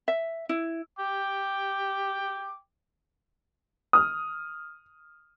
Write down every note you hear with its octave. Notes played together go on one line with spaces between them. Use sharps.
E5
E4
G5 D6
D#6 F6